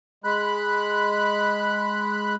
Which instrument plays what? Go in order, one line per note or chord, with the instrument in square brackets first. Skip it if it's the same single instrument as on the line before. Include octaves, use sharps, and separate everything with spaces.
[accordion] G#3 B5 F#6